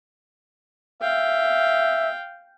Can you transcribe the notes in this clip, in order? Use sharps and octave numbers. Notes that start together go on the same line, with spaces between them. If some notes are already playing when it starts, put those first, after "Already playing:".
E5 F5 G5